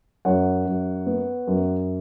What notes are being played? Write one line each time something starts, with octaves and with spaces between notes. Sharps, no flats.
F#2 C#5 F#5
F#2
B3
F#2